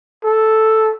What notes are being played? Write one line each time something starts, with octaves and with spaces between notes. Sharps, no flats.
A4